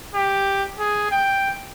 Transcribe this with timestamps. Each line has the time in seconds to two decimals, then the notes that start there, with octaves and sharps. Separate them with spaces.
0.14 G4
0.79 G#4
1.11 G5